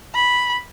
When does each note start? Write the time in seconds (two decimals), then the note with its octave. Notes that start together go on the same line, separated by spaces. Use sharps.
0.15 B5